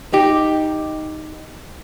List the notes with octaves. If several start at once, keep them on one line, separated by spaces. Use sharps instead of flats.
D#4 G4